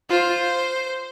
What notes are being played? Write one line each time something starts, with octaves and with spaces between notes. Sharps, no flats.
F4 C5